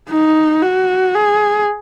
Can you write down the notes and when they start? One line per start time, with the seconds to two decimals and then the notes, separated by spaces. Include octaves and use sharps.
0.11 D#4
0.63 F#4
1.15 G#4